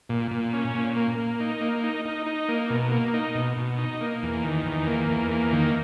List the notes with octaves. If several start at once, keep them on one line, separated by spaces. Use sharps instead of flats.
A#2
A#2
C#4
A#2
A#3
A#3
D#4
A#3
D#4
D#4
D#4
A#3
B2
A#3
D#4
B2
B2
D#4
A#3
E2
D#3
E2
A#3
E2
A#3
D#3